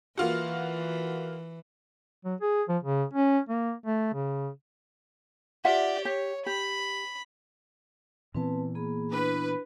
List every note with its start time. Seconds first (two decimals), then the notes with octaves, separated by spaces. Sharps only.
0.18 E3 A#3 F4 F#4
2.25 F#3
2.41 G#4
2.69 F3
2.83 C#3
3.14 C#4
3.49 A#3
3.86 A3
4.14 C#3
5.65 F4 G4 D5 E5 F#5
6.05 G4 C#5
6.46 G4 B5
8.35 A#2 E3 B3 C4 B4 A5
8.75 A#3 G#4 B5
9.12 D4 E4 B4